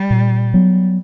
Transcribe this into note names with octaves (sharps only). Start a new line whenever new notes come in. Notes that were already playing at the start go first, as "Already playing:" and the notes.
Already playing: G3
A#2
F#3 B3